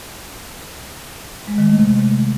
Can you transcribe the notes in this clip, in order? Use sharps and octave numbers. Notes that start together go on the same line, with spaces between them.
G#3
D#3
A3
C3